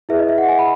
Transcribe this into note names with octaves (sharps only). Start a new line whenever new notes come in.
E4 G#4 B4 E5
D#5
E5
F#5
G#5
B5